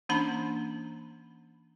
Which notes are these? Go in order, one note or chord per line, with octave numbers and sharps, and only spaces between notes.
E3 A#3 C#4 D4 A#5 B5